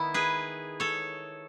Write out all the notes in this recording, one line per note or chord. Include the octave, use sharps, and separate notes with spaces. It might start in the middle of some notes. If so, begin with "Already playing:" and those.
Already playing: D#3 B3 E4
G#4 B4
A4 C#5